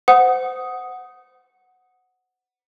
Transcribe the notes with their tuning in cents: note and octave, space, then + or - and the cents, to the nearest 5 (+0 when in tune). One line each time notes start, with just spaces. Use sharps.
C5 -25 F#5 +0 D#6 +5